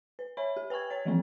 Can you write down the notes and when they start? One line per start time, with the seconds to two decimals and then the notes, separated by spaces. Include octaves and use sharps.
0.19 B4
0.37 C#5 E5 G#5 B5
0.57 G4
0.70 B4 G5 G#5 C#6 G#6
0.90 C#5 G5 A6
1.05 E3 F3 G3 A3 A#3 C4